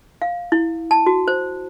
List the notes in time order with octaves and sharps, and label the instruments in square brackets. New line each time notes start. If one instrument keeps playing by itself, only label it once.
[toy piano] F5
E4
A5
F#4
C5